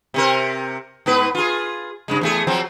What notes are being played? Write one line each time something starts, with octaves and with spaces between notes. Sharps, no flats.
C3 C4 A#4
G#2 B3 B4
F4 G#4
G2 C#3 G#3
E2 A3 G#4
F3 F#3 C4